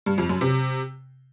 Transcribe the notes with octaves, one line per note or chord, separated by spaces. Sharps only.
G2
F2
F#2
C3